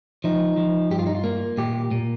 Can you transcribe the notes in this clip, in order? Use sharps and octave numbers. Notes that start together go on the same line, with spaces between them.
F3 D#4
F3
G2 G4
F4
D#4
F4
A#3
A#2 G4
A#2